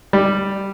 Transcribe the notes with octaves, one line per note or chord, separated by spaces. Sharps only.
G3